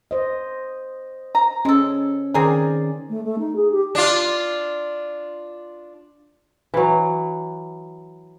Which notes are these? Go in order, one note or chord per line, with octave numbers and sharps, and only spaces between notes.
C5 D#5
A#5
G#3 C#4 A4
D#3 C4 G#4 A#4 D5
A3
A3
D#4
G#4
G4
D4 F4
E3 F#3